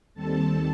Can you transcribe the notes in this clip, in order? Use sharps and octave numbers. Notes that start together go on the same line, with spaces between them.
D#2 D#3 G3 C4 A4 A5